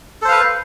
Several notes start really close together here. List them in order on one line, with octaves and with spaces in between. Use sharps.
A4 C5 F5 B4